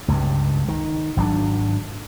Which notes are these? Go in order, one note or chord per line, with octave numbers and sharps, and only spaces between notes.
C#2 G2
D#3
G#1 F#3 D4